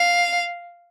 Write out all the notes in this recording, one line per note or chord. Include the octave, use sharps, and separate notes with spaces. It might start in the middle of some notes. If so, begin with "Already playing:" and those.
Already playing: F5